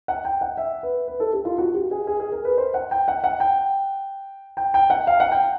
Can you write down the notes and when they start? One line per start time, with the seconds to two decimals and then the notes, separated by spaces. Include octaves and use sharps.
0.08 F#5
0.25 G5
0.41 F#5
0.57 E5
0.83 B4
1.08 B4
1.20 A4
1.33 G4
1.45 F4
1.58 F#4
1.74 G4
1.91 G#4
2.07 G#4
2.20 G#4
2.32 A#4
2.45 B4
2.58 C5
2.74 F#5
2.91 G5
3.08 F#5
3.24 F#5
3.40 G5
4.57 G5
4.74 G5
4.90 F#5
5.07 F5
5.20 F#5
5.32 G5